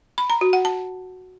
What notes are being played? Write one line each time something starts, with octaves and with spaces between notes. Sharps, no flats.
B5
A#5
F#4
F#5
A5